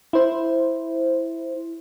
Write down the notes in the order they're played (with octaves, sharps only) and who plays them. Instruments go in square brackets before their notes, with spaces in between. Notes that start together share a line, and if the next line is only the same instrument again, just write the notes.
[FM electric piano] E4 C5